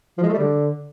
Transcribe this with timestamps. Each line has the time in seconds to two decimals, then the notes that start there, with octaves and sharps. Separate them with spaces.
0.18 F3
0.23 G#3
0.28 A3
0.33 G3
0.38 D3